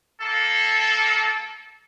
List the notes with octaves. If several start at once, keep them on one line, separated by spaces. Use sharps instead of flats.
A#3 A4